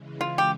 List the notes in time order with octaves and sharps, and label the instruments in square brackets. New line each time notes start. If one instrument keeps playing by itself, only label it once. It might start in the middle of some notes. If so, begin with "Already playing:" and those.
Already playing: [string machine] C#3 E3 G#3
[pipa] F4
G4